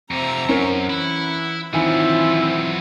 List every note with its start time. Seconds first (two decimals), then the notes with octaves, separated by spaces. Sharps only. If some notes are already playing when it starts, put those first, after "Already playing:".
0.11 F2 C3 C4 E5 A#5
0.49 F#2 C#4 A#4
0.90 E3 E4 F#5
1.74 D#3 E3 F#3 C4 E4 F4 G#5